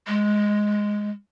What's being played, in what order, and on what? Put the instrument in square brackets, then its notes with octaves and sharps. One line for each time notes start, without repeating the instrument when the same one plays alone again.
[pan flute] G#3